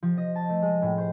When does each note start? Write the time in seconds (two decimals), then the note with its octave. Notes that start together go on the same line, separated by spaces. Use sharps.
0.03 F3
0.18 D#5
0.36 A5
0.49 A3
0.62 G#3
0.82 A2
0.98 C5